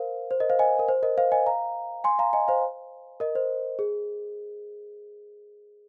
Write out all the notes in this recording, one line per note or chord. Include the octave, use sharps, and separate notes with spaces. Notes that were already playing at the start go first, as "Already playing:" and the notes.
Already playing: A#4 C5 F5
C5
A#4 D#5
C5 F5
D#5 G#5
A#4
C5
A#4 D#5
C5 F5
D#5 G#5
F5 A#5
G#5 C6
F5 A#5
D#5 G#5
C5 F5
A#4 D#5
C5
G#4